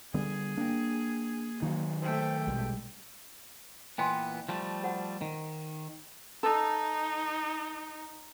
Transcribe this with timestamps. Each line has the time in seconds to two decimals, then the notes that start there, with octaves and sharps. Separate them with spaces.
0.14 D3 G3 B3 G#4
0.57 A#3 D4 G5
1.62 D#3 F#3 D#4 F#4 F5
2.02 A3 C5 G5
2.47 A#1 B2 G3 G#3
3.98 A#2 E3 B3 G5 G#5 C6
4.49 F3 G3 A3
4.83 F#4 C5 F#5
5.21 D#3
6.43 D#4 A4